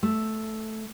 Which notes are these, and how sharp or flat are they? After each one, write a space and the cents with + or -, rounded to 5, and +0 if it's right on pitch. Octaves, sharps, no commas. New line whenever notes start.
A3 -5